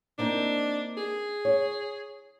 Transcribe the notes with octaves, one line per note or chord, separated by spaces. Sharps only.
A#3 C4 D4 D#4
G#4
C#5